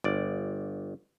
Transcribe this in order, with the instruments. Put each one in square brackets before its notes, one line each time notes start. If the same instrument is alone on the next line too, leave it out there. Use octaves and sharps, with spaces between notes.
[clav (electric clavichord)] G1 D5